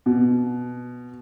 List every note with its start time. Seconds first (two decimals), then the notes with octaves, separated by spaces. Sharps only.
0.06 B2